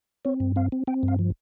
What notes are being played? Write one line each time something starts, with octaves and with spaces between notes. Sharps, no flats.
C4 C#5
G2
C4 F5
C4
C4 G5
G2
F5
F3